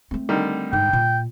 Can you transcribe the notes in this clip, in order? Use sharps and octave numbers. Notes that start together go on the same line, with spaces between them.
A3 C4
D3 D#3 G3
G#2 G5
A#2